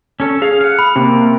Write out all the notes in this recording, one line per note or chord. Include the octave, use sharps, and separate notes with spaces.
C#4 A4
G#4 F5
F5 F#5
B5
C3 A#3